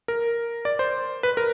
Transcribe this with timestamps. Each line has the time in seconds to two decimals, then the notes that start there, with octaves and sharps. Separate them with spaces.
0.08 A#4
0.65 D5
0.79 C5
1.23 B4
1.37 A#4